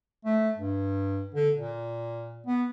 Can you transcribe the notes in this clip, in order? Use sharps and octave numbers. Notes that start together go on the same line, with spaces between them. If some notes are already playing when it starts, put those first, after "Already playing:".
A3
G2
D3
A#2
B3